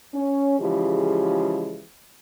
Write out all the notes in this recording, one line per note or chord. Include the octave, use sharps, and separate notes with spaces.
C#4
C#3 E3 F3 G#3 G4 G#4